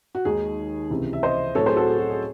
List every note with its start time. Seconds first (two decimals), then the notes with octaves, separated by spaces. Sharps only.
0.15 F#4
0.25 D#2 D#3 G#3 D#4 G#4
0.90 C#2 C3 E3
1.13 E5
1.23 C5 D#5
1.55 A2 F#3 C4 A4 C#5
1.66 G#4 C5
1.77 F#4 A4
1.88 G#4
1.99 F#4
2.10 G#4